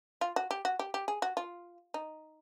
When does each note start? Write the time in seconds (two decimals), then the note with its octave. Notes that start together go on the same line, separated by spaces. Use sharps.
0.21 F4
0.36 F#4
0.51 G4
0.65 F#4
0.79 G4
0.94 G4
1.08 G#4
1.22 F#4
1.37 F4
1.94 D#4